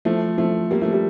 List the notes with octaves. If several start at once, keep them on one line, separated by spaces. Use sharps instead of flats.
F3 A3
F3 A3
G3 A#3
F3 A3
G3